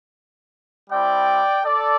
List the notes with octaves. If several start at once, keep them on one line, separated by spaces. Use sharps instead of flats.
G3 C4 E4 D5 G5
A4 D5